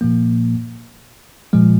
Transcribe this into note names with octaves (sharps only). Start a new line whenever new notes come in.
A#2 F3 A#3
A#2 F3 G#3